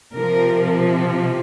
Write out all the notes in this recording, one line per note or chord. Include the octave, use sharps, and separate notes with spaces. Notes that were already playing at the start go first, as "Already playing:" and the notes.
C3 F3 A#4